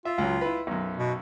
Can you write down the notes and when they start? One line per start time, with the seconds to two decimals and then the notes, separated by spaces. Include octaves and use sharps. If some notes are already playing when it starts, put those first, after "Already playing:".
0.05 F4 E5
0.18 C#2 F#3
0.41 E4 B4
0.67 B1 F#2
0.97 B2